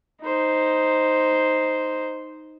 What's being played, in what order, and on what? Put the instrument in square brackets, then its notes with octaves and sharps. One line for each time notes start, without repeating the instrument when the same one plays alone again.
[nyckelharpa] D#4 C5